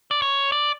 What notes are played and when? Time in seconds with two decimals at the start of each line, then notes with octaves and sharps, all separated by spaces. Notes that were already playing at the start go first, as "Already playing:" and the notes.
0.11 D5
0.22 C#5
0.52 D5